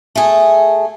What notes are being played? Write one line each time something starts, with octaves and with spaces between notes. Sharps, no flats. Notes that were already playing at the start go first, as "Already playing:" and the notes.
A3 G#4